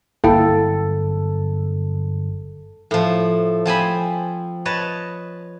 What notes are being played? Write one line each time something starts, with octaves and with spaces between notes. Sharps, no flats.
G1 F#2 A#3 E4 A4 G5
A2 F3
F3 C4 G#5 B5
B4 C#5 D#5 A5